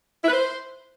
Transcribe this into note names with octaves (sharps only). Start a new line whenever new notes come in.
E4
B4
C5